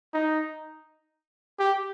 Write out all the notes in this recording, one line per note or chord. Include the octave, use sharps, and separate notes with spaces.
D#4
G4